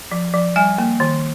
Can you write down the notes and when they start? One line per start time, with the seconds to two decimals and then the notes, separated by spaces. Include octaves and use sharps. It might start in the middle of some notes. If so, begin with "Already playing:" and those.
0.11 F3
0.34 F3
0.56 G3 G#5
0.78 A#3
1.00 D#3